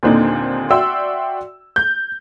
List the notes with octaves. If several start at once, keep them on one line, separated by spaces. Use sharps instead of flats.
D#2 A#2 D3 C4 D4 D#4
F#4 D5 E5 G5 C6 E6
G6